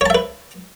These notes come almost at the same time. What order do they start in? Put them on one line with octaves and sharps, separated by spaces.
C#5 A5 E5 B4